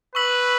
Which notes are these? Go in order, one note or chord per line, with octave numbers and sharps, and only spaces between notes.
B4 C#6 E6 B6 F#7